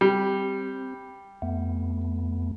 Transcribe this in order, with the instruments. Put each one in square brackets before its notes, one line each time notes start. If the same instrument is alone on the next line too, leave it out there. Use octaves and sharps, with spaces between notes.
[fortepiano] G3 [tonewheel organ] C4
[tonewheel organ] F2 A3 B3